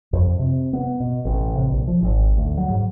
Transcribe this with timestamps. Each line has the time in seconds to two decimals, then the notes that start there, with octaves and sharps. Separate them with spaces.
0.13 F2
0.39 C3
0.73 B3
1.00 B2
1.25 A1
1.56 C3
1.70 A#1
1.87 F3
2.02 G#1
2.37 D2
2.57 F#3
2.70 G#2